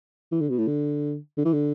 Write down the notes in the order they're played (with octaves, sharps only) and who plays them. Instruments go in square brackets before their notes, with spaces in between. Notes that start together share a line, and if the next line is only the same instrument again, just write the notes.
[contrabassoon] E3
D3
B2
A2
D3
D3
E3
D3